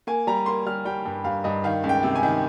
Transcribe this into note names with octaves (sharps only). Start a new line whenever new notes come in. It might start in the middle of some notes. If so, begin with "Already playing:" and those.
A#3 G#5
G3 A#5
A#3 C6
G3 F6
G3 G5
G2
G2 F5
G2 D#5
D#3 F5
C#2
G5
C3
G#5
D#3